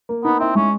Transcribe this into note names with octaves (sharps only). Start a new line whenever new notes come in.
A#3
B3 D#4
C4 E4
G#3 C#4